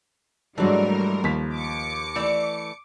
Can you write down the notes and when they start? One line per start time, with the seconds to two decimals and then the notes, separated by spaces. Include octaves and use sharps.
0.58 G#2 E3 F#3 G3 A3 D4 A#4 D5
1.24 D#2 F3 B6
1.54 D6 C#7
2.16 E3 A3 D5